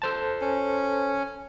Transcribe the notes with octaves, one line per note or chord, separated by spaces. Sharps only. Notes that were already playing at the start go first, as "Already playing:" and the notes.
A4 C5 A5
C#4